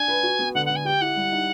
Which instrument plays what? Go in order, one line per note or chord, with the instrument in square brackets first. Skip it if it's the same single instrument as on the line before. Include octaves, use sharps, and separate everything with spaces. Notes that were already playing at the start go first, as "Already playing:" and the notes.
Already playing: [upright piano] D4 [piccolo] G#5
[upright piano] B4
F#4
B3
[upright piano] D3 [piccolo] F#5
[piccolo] F#5
[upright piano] D3
[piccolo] G#5
[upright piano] G4 [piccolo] G5
[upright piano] E4 [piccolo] F#5
[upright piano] G3
D#4